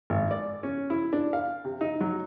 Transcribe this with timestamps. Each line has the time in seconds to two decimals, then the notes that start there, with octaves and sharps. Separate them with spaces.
0.10 G#1
0.31 D5
0.63 C#4
0.90 E4
1.13 D4
1.33 F5
1.65 C3
1.81 D#4
2.01 F#3